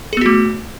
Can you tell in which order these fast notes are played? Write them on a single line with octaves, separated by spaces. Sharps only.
G#4 B3 F#4 A3